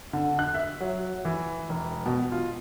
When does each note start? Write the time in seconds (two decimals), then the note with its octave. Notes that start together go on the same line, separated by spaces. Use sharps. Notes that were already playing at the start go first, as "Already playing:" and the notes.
0.13 D3
0.39 F#6
0.55 E5
0.81 F#3
1.25 E3
1.69 E1
2.06 B2
2.32 F4